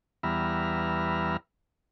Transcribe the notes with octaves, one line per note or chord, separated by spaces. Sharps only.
E2 G3 B3 E5 A#5 F6